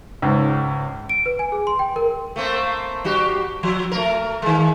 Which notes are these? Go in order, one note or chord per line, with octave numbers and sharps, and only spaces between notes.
C#2 G#2
D7
B4
G#5
G#4
C6
G5
A#4
A3 A#3 C4
G3 F#4 G4
F3
A3 A#4
D#3 G#3